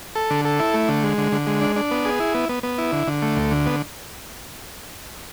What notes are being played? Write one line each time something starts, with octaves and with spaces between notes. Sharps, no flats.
A4
D3
A4
E4
A3
D3
G#3
D3
D3
G#3
D4
D4
B3
G#4
E4
B3
B3
B3
E4
D3
D3
A3
D2
D3
B3